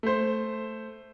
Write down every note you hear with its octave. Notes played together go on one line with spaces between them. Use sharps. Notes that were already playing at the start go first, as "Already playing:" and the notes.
A3 C5